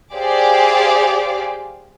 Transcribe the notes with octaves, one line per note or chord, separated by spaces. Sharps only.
G4 G#4 C5 D5 F5 D6